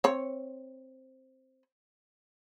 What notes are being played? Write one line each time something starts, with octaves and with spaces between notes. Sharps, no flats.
C4 C#5